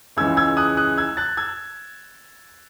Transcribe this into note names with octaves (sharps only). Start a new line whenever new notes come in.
C#2 C#3 E3 G#3 C#4 E6 G#6
E6 G#6
D#6 F#6
D#6 F#6
E6 G#6
F#6 A6
E6 G#6